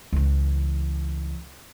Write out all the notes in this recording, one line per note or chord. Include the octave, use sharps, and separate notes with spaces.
C#2 E3